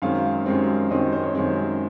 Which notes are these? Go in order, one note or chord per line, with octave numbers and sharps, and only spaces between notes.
F#2 D#3 G#3 C4 F5
F#2 D#3 G#3 C4
F#2 D#3 G#3 C4 D#5
C5
C#5
F#2 D#3 G#3 C4